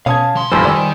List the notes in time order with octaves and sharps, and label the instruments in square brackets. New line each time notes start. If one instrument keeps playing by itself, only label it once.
[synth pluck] B2 G#6 [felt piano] C#4 D#6 [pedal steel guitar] F5 A5
[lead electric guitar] E3 C6
[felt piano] F1 A#1 G2 [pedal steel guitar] C5 G#5 G6 [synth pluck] E6
[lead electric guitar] D#3 [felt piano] G3 [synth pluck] D5 E6